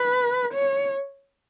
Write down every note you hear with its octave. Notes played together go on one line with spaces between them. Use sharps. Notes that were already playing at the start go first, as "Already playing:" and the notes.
Already playing: B4
C#5